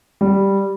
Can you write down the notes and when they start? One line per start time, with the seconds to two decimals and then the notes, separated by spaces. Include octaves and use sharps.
0.21 G3